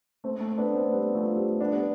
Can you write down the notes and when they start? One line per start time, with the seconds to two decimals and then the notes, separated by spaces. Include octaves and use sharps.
0.24 A3 C4
0.40 A3 C4
0.58 B3 D4
0.74 A3 C4
0.91 G3 B3
1.15 F3 A3
1.37 G3 B3
1.61 B3 D4
1.76 B3